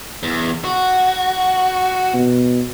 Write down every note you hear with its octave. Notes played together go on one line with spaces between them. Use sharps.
E2
F#4
B2